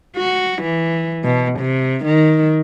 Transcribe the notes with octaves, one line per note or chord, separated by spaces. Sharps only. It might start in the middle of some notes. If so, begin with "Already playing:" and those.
F#4
E3
B2
C3
D#3